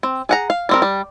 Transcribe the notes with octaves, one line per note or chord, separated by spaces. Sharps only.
C4
G#4 F#5 A#5
F5
G3 C4 A#4
G3